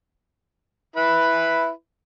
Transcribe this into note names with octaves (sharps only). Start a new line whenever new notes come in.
E4 B4 B5